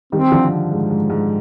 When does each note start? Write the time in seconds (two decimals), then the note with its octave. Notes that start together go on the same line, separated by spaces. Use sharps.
0.12 D#3 G3 C4
0.31 D3 F3
0.71 G#2
0.90 G#2
1.10 G#2